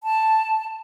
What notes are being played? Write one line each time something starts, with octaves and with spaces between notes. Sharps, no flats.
A5